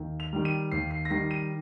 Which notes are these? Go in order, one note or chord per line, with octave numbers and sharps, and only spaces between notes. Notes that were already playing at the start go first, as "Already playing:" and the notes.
Already playing: D#2
F7
D#3 G3
D#7
D#2 C7
C7
A#6
D#3 G3 C7
D#7